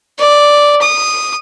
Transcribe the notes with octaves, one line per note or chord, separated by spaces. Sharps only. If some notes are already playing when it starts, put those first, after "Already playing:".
D5
D#6